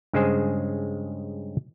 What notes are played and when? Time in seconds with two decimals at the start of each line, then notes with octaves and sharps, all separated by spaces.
0.13 G2 C#3 G#3 G#4 C5 G#5